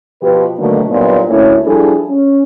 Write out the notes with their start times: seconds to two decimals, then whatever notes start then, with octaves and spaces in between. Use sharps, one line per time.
0.22 B2 F3 G4 B4
0.58 B2 D3 D#3 F#3 A3 A#3
0.89 G2 A#2 F#3 B3 C4 D#4
1.30 D2 A3 A#3 C#4 E4 C#5
1.66 F3 G3 D4 E4 G#4 A4
2.09 C#4